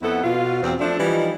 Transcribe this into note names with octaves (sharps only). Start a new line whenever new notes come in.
F2 B3 E4 A4 F#5
B2 F4
E2 B2 C4
F3 A3 D4
E3 F3 G3 D#4